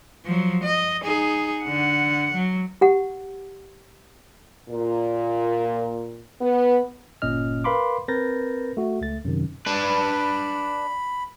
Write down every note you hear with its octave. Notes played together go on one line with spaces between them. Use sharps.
F3 F#3
D#5
D#4 G#4
D3 F#5
F#3
G4 F#5
A#2
B3
G1 A#2 C#4 D#5 F6
A#4 B4 F5 B5 C6 D6
C4 A#4 B4 G6 A6 A#6
A3 F#4
C#2 A3 A6
F#2 C3 D#3
D4 B4 B5